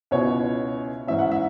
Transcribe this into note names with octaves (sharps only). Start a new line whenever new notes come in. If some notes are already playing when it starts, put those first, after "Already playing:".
C#2 B2 B3 E4 C#5
G#2 E3 C#4 E5
F#5
E5